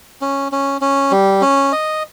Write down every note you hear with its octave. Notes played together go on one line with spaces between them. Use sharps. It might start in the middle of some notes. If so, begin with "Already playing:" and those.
C#4
C#4
C#4
G3
C#4
D#5